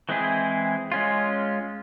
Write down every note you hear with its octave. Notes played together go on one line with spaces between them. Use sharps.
E3 G#3 C4 E4 G#4
G#3 C#4 F4